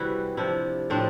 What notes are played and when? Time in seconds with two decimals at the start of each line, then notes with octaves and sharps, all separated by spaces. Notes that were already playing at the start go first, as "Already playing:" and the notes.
Already playing: C3 E3 G3 E4 F#4
0.37 C3 F3 D4 E4
0.90 A2 F3 C4 D4